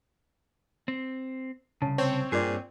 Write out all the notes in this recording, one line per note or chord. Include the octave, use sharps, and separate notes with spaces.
C4
C2 F#2 C#3 C#4 A5
C4 C#5
G2 A#2 G#4 D5